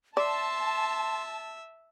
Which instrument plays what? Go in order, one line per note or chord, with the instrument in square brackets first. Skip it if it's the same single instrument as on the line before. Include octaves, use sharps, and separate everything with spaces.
[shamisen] D5 [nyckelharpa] E5 [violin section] A5 [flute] C6